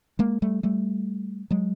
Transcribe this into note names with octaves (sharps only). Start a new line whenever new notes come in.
G#3 A#3
G3 A3
G3 A3
F#3 G#3